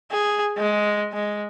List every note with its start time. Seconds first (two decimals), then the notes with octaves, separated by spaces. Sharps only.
0.12 G#4
0.57 G#3
1.12 G#3